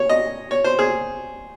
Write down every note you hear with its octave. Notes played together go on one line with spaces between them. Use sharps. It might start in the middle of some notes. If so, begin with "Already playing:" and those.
Already playing: C#5
D#5
C#5
C5
G#4